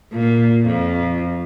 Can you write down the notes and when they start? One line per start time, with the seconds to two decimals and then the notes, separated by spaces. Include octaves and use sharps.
0.13 A#2
0.65 F2